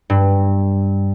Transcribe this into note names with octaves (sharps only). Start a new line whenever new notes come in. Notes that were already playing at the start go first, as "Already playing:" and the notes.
G2